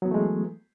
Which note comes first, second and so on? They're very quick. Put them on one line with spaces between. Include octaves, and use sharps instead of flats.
F#3 B3 E3 A3 G#3